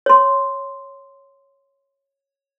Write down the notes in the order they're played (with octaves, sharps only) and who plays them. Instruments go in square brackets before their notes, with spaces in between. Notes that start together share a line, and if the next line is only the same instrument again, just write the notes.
[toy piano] C#5 C6